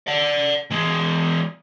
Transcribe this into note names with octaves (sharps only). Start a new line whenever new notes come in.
D5 F#5
E3 G#3